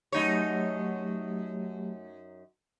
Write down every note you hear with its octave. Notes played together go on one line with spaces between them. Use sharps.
F#2 F#3 A3 D#4 G4 C#5